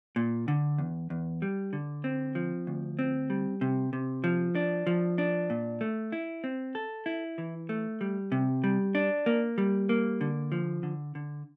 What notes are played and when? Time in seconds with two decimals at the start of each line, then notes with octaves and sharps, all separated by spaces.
0.16 A#2
0.48 D3
0.78 E2
1.10 E2
1.42 G3
1.73 D3
2.04 C4
2.35 F3
2.67 D2
2.99 C4
3.30 G3
3.61 C3
3.93 C3
4.24 F3
4.55 D4
4.87 F3
5.18 D4
5.50 A#2
5.81 A3
6.12 E4
6.44 C4
6.75 A4
7.06 E4
7.38 E3
7.69 A3
8.01 G3
8.32 C3
8.64 G3
8.95 D4
9.26 A#3
9.58 G3
9.89 A#3
10.21 D3
10.52 F3
10.83 D3
11.15 D3